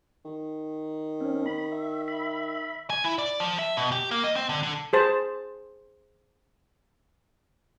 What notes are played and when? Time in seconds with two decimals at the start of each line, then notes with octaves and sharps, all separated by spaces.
0.25 D#3
1.20 C4 C#4
1.46 B5
1.72 E5
2.08 E5 B5
2.90 G#5
3.04 E4
3.18 D5
3.40 F3
3.59 E5
3.77 B2
3.92 G4
4.11 A#3
4.24 D#5
4.36 C4
4.49 D3
4.63 D3
4.93 G#4 C5 A5